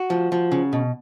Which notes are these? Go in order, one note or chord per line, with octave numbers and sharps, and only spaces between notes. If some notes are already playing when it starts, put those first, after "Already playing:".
Already playing: F#4
F3
F3
C#3
B2